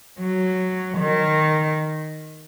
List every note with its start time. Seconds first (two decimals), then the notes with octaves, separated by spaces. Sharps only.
0.19 F#3
0.99 D#3